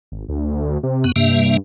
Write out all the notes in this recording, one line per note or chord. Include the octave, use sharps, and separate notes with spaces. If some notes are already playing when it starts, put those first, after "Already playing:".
G#1
D2
C3
F#2 B3
G2 C3 A#3 E5